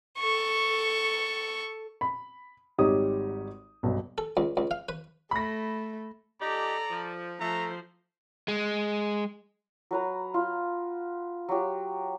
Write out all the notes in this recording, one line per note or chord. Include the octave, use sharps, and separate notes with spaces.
A4 C#6
B5
G#1 G3 D#4 G4 C#5 D#6
B1 G2
A4
C#2
C#2
F5
B4
A3 B5 A#6
F3 D#4 G4 A4 D5 A#5
F3
F3 A3 C5 A#5
G#3
F#3 B4 A#5
F4
F#3 G4